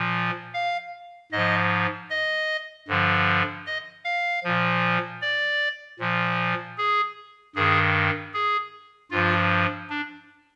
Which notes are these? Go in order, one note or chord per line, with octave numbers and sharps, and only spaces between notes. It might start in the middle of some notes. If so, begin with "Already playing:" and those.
Already playing: A#2 F3
F5
G#2 F3 D#5
D#5
G2 D3 F3
D#5
F5
A#2 F3
D5
A#2 F3
G#4
G2 D#3 G#4
G#4
G2 F3 F4
D4